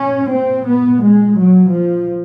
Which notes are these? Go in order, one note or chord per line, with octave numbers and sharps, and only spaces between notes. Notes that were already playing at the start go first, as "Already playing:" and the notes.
Already playing: A#2 C#4
C4
B3
G#3
F#3
F3